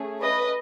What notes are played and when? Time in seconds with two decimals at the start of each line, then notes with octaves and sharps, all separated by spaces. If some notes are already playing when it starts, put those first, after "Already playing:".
Already playing: A3 C#4 G#4
0.20 B4 D#5